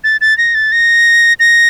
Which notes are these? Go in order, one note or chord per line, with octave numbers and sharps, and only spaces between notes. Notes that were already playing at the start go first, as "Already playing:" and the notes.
A6
A6
A#6
A6
A#6
A#6